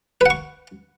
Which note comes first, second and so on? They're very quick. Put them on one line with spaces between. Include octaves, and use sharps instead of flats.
B4 F#5 C#6